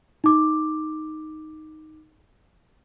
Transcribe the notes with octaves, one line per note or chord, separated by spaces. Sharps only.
D#4 D6